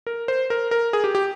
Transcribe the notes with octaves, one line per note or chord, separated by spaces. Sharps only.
A#4
C5
A#4
A#4
G#4
G4
G4